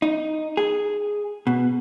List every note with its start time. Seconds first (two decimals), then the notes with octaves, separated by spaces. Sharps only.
0.02 D#4
0.57 G#4
1.47 B2